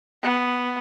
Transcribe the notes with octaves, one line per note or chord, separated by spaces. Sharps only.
B3